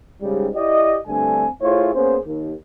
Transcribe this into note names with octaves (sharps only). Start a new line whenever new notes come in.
G#2 C#3 G3
E4 G4 D5 D#5
G2 D3 A3 C4 D4 G#5
A3 E4 F4 G#4 C5 C#5
A#3 B3 C#4 G#4 C5
D#2